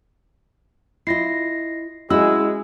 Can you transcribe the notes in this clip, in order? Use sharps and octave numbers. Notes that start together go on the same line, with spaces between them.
E4 F4 D#5 A#6 C7
G#3 C#4 E4 F#4 E6